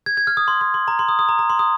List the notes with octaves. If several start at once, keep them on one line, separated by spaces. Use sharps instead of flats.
G#6
G#6
F6
D#6
C6
C6
C6
A#5
C6
D#6
D#6
A#5
A#5
C6
D#6